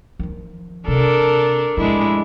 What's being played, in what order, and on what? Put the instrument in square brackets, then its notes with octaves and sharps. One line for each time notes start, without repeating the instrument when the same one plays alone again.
[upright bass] D#3 F3
[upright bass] C3 [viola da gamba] D4 A4 A#4
[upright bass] A2 F3 [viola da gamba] G#3 D4 E4